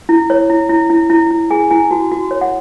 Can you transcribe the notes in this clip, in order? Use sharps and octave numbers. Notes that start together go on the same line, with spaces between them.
E4
C#5
E4
E4
E4
E4
E4
G#4 G#5
E4 G#5
F#4 A5
F#4
C#5
F#5